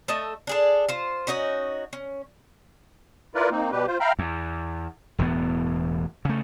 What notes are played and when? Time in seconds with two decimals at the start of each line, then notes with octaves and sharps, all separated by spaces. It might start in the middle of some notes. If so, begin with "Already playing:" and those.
0.08 A3 A4 D#5 E5
0.47 D4 G#4 A4
0.89 F4 C5
1.27 C#4 D#4 F#4 D#5
1.93 C#4
3.35 E4 F4 A#4 B4 D5
3.51 A#3 C4 D#4
3.72 B2 G3 G4 B4
3.87 F4 C5
4.00 E5 F5 G5 A#5 B5 F6
4.19 E2
5.18 E1 E2 A2 B3
6.25 C#3 A3